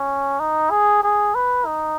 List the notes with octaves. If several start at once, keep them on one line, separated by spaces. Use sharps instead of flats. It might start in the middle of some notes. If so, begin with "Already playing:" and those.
Already playing: C#4
D#4
G#4
G#4
B4
D#4